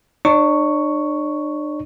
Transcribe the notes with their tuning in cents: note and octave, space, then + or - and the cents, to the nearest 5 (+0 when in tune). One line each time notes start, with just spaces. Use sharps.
D4 +40 C#5 +5 C#6 +5